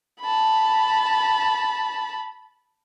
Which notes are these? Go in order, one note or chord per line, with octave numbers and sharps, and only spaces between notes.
A5 B5